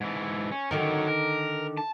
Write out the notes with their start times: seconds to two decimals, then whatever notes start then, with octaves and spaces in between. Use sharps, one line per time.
0.01 G#2 E3
0.52 C#4
0.71 D3 D#3 F#3 D#4 A#4
1.07 A#4
1.77 A5